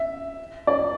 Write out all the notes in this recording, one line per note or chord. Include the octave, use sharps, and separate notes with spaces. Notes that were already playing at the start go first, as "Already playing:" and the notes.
Already playing: E5
D5